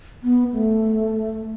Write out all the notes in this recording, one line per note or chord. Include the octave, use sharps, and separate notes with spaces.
B3
A3